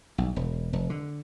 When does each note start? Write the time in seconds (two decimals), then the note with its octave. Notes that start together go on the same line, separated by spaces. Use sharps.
0.18 B1
0.36 E1
0.73 F1
0.90 D3